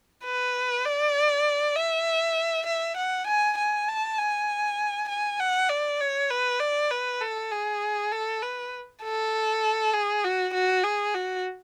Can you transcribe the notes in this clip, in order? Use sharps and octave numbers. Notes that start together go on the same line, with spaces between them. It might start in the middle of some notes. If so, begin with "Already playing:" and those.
B4
D5
E5
E5
F#5
G#5
G#5
A5
G#5
G#5
F#5
D5
C#5
B4
D5
B4
A4
G#4
A4
B4
A4
G#4
F#4
F#4
G#4
F#4